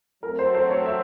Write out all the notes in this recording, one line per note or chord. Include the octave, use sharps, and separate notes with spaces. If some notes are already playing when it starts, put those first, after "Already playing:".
F#3 A3 C4 A#4
C5
C5
C#5
E5